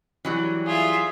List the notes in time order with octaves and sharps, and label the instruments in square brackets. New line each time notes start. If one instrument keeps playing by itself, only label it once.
[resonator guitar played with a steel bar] E3 F#3 G3
[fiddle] F4 E5 [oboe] G#4